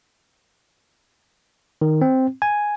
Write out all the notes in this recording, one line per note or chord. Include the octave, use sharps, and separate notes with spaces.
D#3
C4
G#5